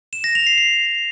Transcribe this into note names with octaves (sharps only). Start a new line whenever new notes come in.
E7
A#6
F7
C7
C7